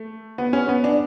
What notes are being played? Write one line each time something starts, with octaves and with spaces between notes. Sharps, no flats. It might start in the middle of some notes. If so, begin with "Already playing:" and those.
Already playing: A3
B3
C#4
B3
D4